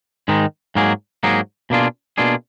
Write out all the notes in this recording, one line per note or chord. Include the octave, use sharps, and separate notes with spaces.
G#2 D#3 G#3 D#4
G#2 F#3 A#3 D#4 G#4
G#2 F#3 A#3 D#4 G#4
B2 A#3 D4 F4 G#4
B2 A#3 D4 F4 G#4